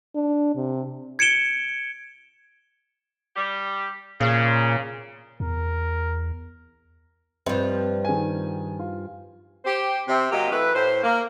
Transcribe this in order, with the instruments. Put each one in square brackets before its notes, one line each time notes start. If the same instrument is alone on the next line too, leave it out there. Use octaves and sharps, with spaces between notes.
[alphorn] D4
C3
[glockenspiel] G#6 C#7 D7 E7 G7
[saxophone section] G3 G4
[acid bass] A#2 [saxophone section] C#3
[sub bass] E2 [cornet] A#4
[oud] G2 F3 [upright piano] C4 C5 D#5
[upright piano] D#3 G#4 G#5
F4
[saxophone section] G4 C5
C3 C4
F#3 A#3 G4 D#5
E3 A3 B4
A2 C5
A#3